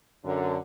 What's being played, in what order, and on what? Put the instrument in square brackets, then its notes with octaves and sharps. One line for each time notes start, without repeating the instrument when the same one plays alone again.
[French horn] F#2 [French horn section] D3